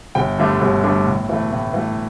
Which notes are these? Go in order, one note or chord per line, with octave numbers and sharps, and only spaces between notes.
G1 G5
G2 D3 A3 D4
G1
G2 D3 A3 D4
A2
E3 A3
A2
E3 A3